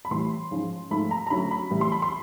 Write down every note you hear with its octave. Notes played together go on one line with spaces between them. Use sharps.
B5
A2 E3 G3 C6
G#2 F3 G#3 C#4
G#2 F3 A3 B5
A#5
A#5
D3 F#3 A3 C#4 B5
B5
A2 E3 G3
C6
B5
C6